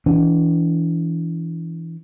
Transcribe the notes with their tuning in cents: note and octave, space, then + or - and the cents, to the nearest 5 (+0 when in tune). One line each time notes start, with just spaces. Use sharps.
E3 +0 D4 -40